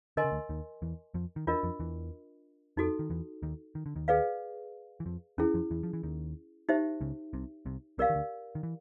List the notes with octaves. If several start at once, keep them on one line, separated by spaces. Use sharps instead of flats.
D3 A#4 D#5 G#5 C6
C#3
D2 D3
D#2 D#3
E2 E3
F2 F3
D#3
E2 E3 D4 F4 A#4 D#5
F2 F3
E2 E3
F2 F3 D#4 F#4 A4
D#3
E2 E3
D#2 D#3
D#3
D3
D#2 D#3
G#4 B4 D5 F5
E3
F2 F3
E2 E3 C#4 E4 G#4
F2 F3
E2 E3
F3
E3
D#2 D#3
D#4 G4 C5 E5
C#2 C#3
C2 C3
C2 C3
C2 C3 G4 A#4 D5 F5
D#3
D2 D3
D#3
E3